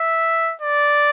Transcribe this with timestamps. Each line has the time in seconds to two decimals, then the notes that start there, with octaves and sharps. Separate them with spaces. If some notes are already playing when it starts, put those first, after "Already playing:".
Already playing: E5
0.61 D5